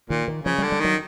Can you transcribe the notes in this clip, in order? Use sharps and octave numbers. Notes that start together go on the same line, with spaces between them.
A#2 D#3
D#3
C#3 F3
G3
D3
G3
D#3 F#3